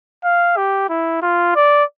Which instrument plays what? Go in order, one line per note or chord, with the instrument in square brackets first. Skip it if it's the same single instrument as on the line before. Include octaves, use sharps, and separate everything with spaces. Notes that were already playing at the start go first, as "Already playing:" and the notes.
[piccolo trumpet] F5
G4
E4
F4
D5